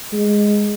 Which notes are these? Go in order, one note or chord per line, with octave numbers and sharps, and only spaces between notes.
G#3